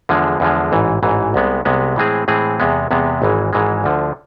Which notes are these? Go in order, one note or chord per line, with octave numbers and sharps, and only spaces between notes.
E2 D3 F3 G#3
E2 D3 F3 G#3
A1 G#2 E3
A1 G#2 E3
C2 C3 G#3 B3
C2 C3 G#3 B3
A2 E3 G#3 C4 G#4
A2 E3 G#3 C4 G#4
E2 C3 G#3 B3
E2 C3 G#3 B3
G#1 G#2 E3 G#3
G#1 G#2 E3 G#3
D2 D3 F3